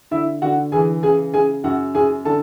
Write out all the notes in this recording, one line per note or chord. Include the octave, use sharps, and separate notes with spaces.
D3 E4 E5
D3 F#4 F#5
E3 G#4 G#5
C#3 G#4 G#5
C#3 G#4 G#5
F#2 F#4 F#5
F#2 G#4 G#5
D3 A4 A5